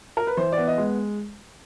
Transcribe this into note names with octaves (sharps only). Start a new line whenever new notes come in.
A#4
B4
E3 C5
B3 D5
D#5
G#3